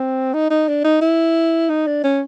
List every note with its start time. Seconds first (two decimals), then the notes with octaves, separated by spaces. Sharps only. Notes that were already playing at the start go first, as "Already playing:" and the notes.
Already playing: C4
0.33 D#4
0.50 D#4
0.68 D4
0.84 D#4
1.01 E4
1.69 D#4
1.87 D4
2.04 C#4